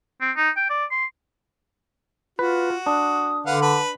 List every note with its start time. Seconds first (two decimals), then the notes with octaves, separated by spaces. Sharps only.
0.21 C4
0.36 D#4
0.57 G5
0.70 D5
0.91 C6
2.39 F4 F#4 B4
2.86 D4 D#6
3.46 D3 B4 F5 F#5
3.62 B4 A5 B5